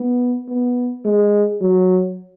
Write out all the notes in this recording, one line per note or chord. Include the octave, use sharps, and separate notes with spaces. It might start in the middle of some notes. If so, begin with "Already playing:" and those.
Already playing: B3
B3
G#3
F#3